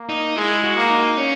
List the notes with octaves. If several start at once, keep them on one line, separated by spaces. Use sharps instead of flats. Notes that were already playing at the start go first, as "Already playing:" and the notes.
Already playing: A#3
D#4
G#3 E4
F#4
A#3
D#4
C#4